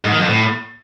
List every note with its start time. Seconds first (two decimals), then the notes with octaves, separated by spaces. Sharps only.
0.05 G#2
0.12 D#3
0.19 F2
0.27 A2